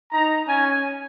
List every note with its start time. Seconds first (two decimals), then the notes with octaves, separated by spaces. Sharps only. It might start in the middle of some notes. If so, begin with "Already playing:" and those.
0.12 D#4 A#5
0.48 C#4 G#5